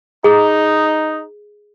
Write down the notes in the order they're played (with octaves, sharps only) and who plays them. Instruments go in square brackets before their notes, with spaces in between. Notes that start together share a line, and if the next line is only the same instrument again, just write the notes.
[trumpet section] D#4 [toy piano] G#4